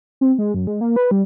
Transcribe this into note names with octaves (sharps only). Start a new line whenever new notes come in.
C4
G#3
F#2
G#3
A#3
B4
G3